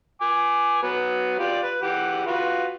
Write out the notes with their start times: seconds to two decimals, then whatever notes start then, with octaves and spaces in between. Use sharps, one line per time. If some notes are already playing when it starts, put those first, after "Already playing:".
0.21 G#5 D6
0.83 F#3 B3
1.39 F4 G4 D5
1.63 B4
1.82 E3 G4 F#5
2.27 F4 F#4 B4